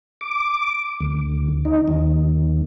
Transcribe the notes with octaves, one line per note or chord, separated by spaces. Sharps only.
D6
D2
D#4
D#2